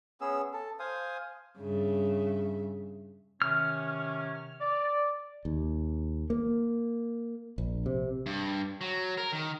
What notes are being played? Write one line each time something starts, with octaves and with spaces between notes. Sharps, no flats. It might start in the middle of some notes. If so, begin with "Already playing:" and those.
B3 C#4 G#4 E6
A4
C5 F5 G#5 D#6
G2 C#3 E5
C3 D#3 C#4 F6
D5
D#2
A#3
A#1
C3
G2
F#3
A#4
D#3